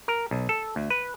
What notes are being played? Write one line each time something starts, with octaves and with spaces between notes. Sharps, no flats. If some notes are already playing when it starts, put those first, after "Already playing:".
A#4
B1
A4
D2
B4